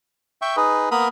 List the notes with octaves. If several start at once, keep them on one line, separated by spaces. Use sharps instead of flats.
E5 G5 C#6
D#4 G#4 B4
A#3 B3 A#4 B5 D#6